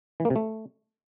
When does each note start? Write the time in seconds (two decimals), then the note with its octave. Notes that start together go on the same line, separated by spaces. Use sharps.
0.20 E3
0.25 A#3
0.30 C3
0.36 A3